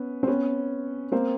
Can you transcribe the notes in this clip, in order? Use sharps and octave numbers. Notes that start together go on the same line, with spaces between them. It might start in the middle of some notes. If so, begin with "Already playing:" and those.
Already playing: B3 C#4
C4
B3 C#4
A#3 C4